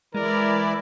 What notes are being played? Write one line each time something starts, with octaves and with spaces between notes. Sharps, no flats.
E3 G#3 E4 A#4 D5